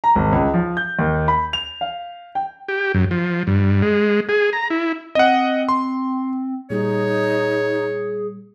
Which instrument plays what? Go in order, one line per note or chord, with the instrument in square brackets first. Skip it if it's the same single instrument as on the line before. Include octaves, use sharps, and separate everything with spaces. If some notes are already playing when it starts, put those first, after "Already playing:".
[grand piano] A#5
G#1
C#2
F3
G6
D#2
B5
F7
F5
G5
[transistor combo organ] G4
F#2
F3
G2
G#3
G#4
A#5
E4
[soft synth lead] C4 [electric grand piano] D#5 F#5
[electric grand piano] C6
[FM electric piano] A#2 G3 [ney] D#4 [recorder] G#4 [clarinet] C#5